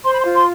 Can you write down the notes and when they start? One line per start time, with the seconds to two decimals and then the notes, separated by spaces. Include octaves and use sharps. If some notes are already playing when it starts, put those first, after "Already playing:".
0.04 C5 C6
0.13 B5
0.21 C6
0.25 F4
0.34 C6